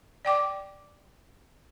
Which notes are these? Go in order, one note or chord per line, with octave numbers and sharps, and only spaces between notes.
D5 G5 D6